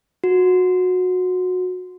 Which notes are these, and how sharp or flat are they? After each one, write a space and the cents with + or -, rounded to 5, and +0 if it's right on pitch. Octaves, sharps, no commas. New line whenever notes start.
F#4 -20